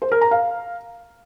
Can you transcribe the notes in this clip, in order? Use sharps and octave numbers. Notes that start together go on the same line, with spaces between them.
C5
A#4
A#5
F5